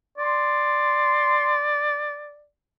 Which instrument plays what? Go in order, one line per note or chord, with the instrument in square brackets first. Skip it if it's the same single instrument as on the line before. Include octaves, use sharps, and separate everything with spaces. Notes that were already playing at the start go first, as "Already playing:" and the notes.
[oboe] D5 [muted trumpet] C6